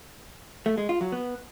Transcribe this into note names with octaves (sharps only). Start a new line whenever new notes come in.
A3
G#3
F4
F#3
B3